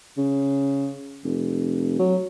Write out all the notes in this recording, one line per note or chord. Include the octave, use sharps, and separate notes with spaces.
C#3
F1
F#3